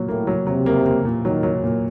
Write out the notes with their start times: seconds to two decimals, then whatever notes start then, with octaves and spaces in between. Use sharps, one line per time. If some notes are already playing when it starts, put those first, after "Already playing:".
Already playing: A#2 F#3
0.08 A2 A#3
0.27 F#3
0.47 C3 F#3
0.66 A#3
0.86 A#3
1.05 A#2
1.24 D#3 F#3
1.43 F#3
1.64 A#2